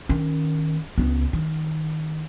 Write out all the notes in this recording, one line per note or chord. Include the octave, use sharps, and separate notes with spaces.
D#3 C#4
C#2 B3
D#3